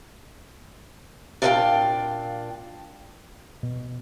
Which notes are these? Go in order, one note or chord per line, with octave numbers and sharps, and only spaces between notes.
A#2 D4 E4 A#4 F5 G5
B2